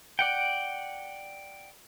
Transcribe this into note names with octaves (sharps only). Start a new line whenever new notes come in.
D5 F#5 G5